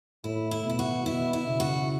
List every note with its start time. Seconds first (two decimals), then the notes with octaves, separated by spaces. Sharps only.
0.24 A2 E4
0.51 E4
0.65 B2 E4
0.79 F#4
1.06 B2 E4
1.33 E4
1.47 C#3
1.60 F#4